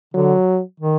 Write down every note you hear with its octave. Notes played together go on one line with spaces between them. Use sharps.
D3 F#3
D#3